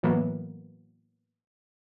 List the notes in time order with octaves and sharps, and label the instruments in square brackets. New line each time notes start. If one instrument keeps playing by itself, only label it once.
[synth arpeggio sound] A2 E3 F#3 A#3 B3